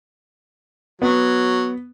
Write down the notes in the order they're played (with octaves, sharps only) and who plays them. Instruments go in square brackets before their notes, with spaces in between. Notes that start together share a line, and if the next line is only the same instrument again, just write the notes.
[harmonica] F#3 [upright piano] B3